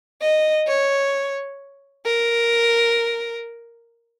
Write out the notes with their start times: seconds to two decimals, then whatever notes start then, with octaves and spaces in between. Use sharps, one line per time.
0.22 D#5
0.68 C#5
2.06 A#4